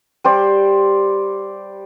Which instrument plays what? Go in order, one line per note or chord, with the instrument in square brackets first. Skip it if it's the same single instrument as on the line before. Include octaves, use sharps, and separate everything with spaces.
[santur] G3 G4 C5 D5